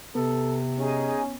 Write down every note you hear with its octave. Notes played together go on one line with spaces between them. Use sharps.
C3 B3 A4
C#4 D#4 G#4 G#5